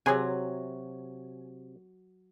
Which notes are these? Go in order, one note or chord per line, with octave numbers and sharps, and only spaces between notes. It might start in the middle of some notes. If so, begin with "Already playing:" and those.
C3 F#3 F#4 G#4 C#5 G#5